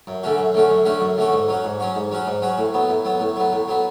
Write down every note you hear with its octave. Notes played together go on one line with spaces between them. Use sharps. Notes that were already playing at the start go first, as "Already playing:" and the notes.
F#2
D3 A3 C#4 F#4
F#2
D3 A3 C#4 F#4
F#2
D3 A3 C#4 F#4
F#2
D3 A3 C#4 F#4
G#2
F#3 C#4 F#4
G#2
F#3 C#4 F#4
G#2
F#3 C#4 F#4
G#2
F#3 C#4 F#4
A2
F#3 B3
A2
F#3 B3
A2
F#3 B3
A2
F#3 B3